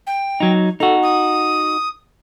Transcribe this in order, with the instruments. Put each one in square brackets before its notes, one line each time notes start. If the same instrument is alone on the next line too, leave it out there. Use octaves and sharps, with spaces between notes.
[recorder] G5
[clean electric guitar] F#3 D#4
[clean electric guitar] D#4 F#4 [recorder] A4
[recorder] D#6